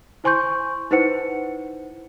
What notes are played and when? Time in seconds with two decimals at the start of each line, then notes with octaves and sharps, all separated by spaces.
0.24 E4 C5 G#5 C6 C#6 G6
0.91 D#4 E4 B4 C5 F#5 C#7